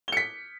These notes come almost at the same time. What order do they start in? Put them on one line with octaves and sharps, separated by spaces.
G7 C#7 B6